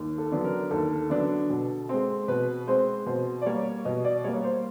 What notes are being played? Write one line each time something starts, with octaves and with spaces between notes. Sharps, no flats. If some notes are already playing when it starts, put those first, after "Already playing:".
Already playing: D#2
A4
D3 F#3 B3 D4
A#4
D#2 A4
D3 F#3 B3 D4
B2
G#3 C4
B2 B4
G#3 C4 C5
B2 C5
D5
G3 A#3 C#5
B2 D#5
D5
G3 A#3 C#5
C5